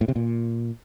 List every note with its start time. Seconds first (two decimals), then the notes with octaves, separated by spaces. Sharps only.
0.01 A2
0.08 C3
0.16 A#2